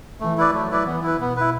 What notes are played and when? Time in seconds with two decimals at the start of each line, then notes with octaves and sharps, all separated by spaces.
0.20 E3 A3
0.37 E4 B4 D5
0.54 F#3 A3
0.71 E4 B4 D5
0.87 E3 B3
1.03 E4 B4
1.20 B2 B3
1.37 E4 B4